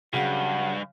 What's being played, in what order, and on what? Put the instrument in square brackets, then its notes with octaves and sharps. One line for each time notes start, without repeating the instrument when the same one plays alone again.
[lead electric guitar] G2 [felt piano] C#3 F#3 [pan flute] F#5